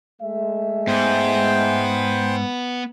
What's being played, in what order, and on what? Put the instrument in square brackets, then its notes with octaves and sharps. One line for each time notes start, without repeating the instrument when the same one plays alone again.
[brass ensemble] G#3 A3 E5
[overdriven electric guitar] G#2 [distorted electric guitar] B3 [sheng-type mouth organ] C5 G5